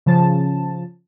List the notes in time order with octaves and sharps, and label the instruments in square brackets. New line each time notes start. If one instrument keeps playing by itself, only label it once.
[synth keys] C#3 F3 A5